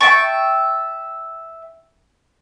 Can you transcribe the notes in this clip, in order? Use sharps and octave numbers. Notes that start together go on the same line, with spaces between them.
E5 G5 A5 C#6